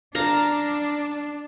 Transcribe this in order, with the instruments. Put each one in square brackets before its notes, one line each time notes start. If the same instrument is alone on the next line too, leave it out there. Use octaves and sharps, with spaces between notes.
[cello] D4 [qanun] F5 A#5